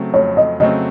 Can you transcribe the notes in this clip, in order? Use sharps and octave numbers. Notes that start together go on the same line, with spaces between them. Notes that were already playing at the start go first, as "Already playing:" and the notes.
Already playing: C#3 F#3 A3 C4
F2 C#5
D#5
C#3 F#3 A3 C4 D#5